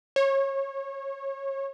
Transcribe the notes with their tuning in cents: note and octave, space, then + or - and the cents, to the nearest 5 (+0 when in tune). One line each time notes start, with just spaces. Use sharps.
C#5 -25